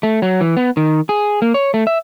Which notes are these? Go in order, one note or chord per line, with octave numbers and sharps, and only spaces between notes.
A3
F#3
E3
B3
D#3
G#4
A#3
C#5
A3
E5